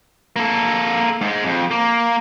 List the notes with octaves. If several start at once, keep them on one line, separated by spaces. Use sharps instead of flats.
A#3 A4
G#2 G#3
F2
A#3